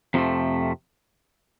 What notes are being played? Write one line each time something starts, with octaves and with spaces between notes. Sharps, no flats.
F2 C3 F3 A3